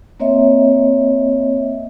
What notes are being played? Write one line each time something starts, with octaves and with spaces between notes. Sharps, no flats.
A#3 C4 C#5 D#5 E5